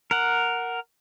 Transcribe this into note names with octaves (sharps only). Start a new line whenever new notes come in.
A#4 F#5